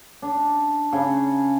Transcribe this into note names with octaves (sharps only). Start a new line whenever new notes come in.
D4
C#3